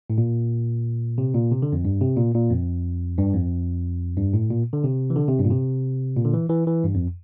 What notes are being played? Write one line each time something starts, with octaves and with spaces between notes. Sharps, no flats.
A2
A#2
C3
A#2
C3
D3
F2
G2
C3
A#2
A#2
F2
G2
F2
G2
A2
A#2
D3
C3
E3
D3
C3
G2
A#2
C3
A#2
D3
E3
E3
E3
G2
F2